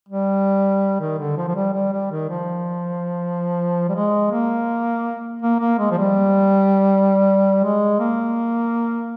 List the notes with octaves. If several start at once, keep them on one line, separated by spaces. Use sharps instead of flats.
G3
D#3
D3
F3
F3
G3
G3
G3
D#3
F3
G3
G#3
A#3
A#3
A#3
G#3
F3
G3
G#3
A#3